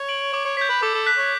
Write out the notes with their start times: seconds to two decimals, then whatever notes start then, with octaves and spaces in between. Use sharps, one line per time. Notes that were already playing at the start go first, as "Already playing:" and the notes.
Already playing: C#5
0.09 D7 F#7
0.33 C#5 D6
0.45 C#5
0.57 C#5 G6 B6
0.70 B4
0.82 A4 D6
0.94 A4
1.06 F#6 B6
1.19 C#5